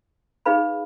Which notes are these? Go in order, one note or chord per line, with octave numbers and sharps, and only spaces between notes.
D#4 G#4 B4 F5 B5